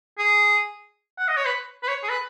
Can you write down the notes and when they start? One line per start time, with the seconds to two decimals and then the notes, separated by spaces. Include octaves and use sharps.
0.19 G#4
1.19 F#5
1.28 D#5
1.37 C#5
1.46 B4
1.83 B4
1.88 C#5
2.03 G#4
2.09 B4